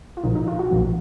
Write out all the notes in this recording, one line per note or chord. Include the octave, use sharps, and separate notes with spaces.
F4
A#1 A#2 F3 D#4
D#4
F4
F#4
A#1 A#2 F3